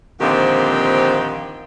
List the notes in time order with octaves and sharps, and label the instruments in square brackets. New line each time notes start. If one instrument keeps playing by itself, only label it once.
[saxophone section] A#2 D3 D#3 F3 C4 G4